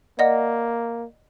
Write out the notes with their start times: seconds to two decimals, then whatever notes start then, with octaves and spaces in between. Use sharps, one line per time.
0.19 A#3 D5 D#5 F#5